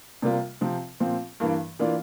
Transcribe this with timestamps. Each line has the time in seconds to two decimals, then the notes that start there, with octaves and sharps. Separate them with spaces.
0.22 C3 G3 A#3 F4
0.61 C3 F3 C4
1.00 A#2 F3 C4
1.40 G2 E3 A#3
1.79 E3 A#3 D4 F4